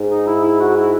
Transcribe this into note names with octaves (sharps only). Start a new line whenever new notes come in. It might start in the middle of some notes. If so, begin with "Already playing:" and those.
Already playing: G#2
D#4
E4
E4
F#4
E4